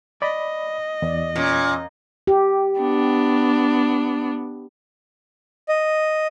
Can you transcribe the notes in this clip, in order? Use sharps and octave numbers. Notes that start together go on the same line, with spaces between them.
D5 D#5 B5
E2 D5
A#2 C#4
G4
B3 D4
D#5